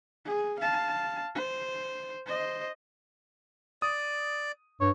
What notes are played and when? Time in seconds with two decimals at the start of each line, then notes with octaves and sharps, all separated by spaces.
0.25 G#4
0.59 F5 A5
1.35 C5
2.26 C5 D#5
3.82 D5 D#6
4.81 G2 C#5